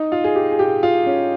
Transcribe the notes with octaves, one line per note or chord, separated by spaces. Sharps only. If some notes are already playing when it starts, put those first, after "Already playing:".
Already playing: D#4
F4
G#4
G4
G#4
G4
F4
C#4